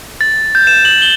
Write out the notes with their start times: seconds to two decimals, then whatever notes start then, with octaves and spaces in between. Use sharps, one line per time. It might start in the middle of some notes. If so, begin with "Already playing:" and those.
0.21 A6
0.55 G6
0.67 E7
0.85 F#7
1.02 G7